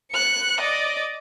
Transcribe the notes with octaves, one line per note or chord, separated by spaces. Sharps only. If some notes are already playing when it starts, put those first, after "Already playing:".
F#6 C#7
D5 D#5